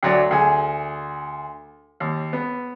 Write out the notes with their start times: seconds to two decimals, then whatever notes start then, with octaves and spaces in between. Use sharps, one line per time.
0.03 D2 F#3 D5
0.31 D2 G#4 G#5
2.00 D#2
2.33 B3